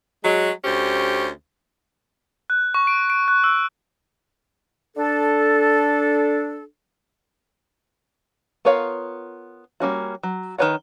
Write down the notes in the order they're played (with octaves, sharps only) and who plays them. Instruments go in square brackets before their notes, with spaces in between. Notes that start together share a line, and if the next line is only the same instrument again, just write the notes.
[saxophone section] F#3 G#3
D2 C#4 G4 C5
[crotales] F#6
C#6
D7
D7
F#6
E6
[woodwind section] D4 A4
[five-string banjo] B3 F4 A#4 C#5 F5
G3 A#3 C#4 F#4
F#3
D#3 A4 B4 C#5 F#5